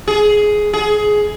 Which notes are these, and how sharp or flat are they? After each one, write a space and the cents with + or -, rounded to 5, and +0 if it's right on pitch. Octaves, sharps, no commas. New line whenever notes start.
G#4 +10
G#4 +15